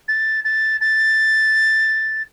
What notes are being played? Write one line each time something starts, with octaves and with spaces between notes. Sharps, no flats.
A6
A6
A6